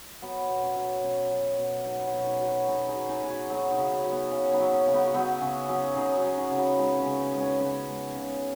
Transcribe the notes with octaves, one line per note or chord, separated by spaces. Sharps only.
F#3 B3
B2
C#4
F#3
B2 C#4
F#3
B2
F#3 B3 D#4
C#4 F#4
B2
D#4 G#4
F#3
F#4 B4
B2 D#4 G#4
D#4 G#4
F#3
D#4 G#4
B2 G#4
F#4 B4
F#3 D#4 G#4
B3 D#4
C#3
C#4
F#3
B3
C#3 C#4
B3 D#4
F#3
C#4
C#3
B3 D#4
F#4
F#3 B3 D#4
C#3 C#4
F#3 C#4
C#3 D#4 G#4
C#4 F#4
F#3
D#4 G#4
C#3
F#4 B4
G#3 D#4 G#4
C#4
C#3
B3 D#4
G#3
C#4
C#3 C#4 F#4
G#3
C#3